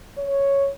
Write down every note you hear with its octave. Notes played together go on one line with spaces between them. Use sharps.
C#5